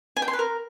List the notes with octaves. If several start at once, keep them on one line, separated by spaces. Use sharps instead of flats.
G#5
G5
C6
B4
A#4